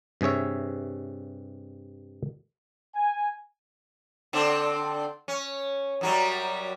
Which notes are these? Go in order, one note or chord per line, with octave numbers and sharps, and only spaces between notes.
G2 C3 G#4 C#5 E5
G#5
D3 C4 D4
C#4
F#2 F#3 G3